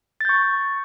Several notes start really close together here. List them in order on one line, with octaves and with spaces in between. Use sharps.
A6 G6 C#6